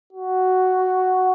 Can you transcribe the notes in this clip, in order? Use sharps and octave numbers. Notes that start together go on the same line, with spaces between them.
F#4